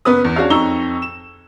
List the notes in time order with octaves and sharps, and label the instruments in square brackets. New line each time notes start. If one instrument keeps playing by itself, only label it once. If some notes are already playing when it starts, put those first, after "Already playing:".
[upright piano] F#1 B3 B4 D#6
E2
C#4 D4 F#4 G#4 C#5 F5
F2 D#4 A#5 C#6 E6 G7
E7